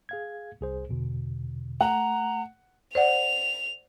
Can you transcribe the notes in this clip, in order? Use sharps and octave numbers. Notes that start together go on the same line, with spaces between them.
G#4 F5 G#6
C2 G#4 C5
E2 B2 D3
A3 F#5 A#5
C5 D5 F#5 F7